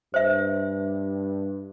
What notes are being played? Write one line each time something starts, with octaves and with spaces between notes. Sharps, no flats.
G2 C5 E5